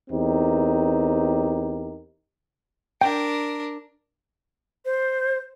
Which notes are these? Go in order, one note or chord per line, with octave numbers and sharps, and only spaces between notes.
E2 C4 D#4 G4 A#4
D4 A#4 G5
C5